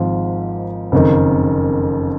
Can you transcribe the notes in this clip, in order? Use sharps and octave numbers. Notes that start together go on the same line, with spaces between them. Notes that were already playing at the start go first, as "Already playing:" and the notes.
Already playing: G#1 G#2 F3
F#1 F2 D#3